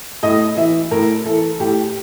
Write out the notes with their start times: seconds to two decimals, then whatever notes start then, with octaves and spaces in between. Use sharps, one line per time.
0.23 A2 D#5
0.57 E3 E5
0.91 A2 A#4
1.26 E3 A4
1.59 A2 G4